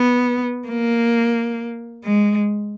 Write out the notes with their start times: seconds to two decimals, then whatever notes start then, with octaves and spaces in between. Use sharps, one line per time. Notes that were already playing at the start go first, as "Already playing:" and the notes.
Already playing: B3
0.69 A#3
2.04 G#3